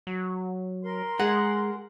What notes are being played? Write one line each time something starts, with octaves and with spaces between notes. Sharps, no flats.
F#3
A#4 C6
G#3 G#4 F#5